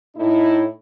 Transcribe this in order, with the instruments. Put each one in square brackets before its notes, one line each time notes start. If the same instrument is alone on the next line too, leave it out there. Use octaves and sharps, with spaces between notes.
[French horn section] A2 D#4 E4